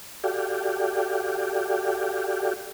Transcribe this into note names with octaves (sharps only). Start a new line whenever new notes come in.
F#4 G4 A4 D5 F5 G5